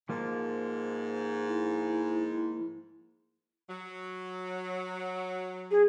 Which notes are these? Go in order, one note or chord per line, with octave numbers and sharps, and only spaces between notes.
G#2 F3 A#3
E4
F#3
G#4